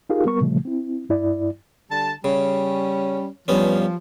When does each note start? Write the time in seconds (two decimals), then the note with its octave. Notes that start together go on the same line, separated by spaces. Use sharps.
0.10 D#4 F4 G4 G#4 A#4 F5
0.25 G3 B3 A#4 C#6
0.41 A#2 C#3 F3 G3 A3
0.65 C4 E4
1.09 G2 E4 D5
1.91 D3 G3 A5
2.24 C#3 G3 C#4
3.48 G2 F3 B3 C#4